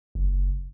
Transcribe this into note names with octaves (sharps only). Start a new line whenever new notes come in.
F#1